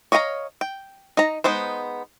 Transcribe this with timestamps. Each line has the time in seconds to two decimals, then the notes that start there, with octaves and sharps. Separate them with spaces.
0.12 C#5 D#5 F5 G5 A#5
0.61 G5
1.17 D#4 A#5
1.44 G#3 B3 D#4 C5